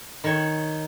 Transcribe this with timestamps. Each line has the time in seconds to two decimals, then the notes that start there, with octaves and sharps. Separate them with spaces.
0.24 D#3 C#5